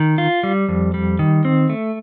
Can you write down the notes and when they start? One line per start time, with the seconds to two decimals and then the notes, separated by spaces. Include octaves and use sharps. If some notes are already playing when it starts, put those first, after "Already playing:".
Already playing: D#3
0.18 F4
0.43 G3
0.69 F2
0.94 G3
1.19 D#3
1.45 C4
1.69 A3